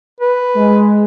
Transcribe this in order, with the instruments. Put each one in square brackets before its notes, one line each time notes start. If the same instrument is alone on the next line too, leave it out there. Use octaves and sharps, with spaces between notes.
[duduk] B4
[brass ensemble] G#3